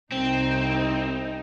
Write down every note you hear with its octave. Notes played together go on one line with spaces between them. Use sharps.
C2 C4 D#4